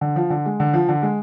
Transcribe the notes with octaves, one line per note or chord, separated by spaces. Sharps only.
D3
F3
D3
G#3
D3
F3
D3
G#3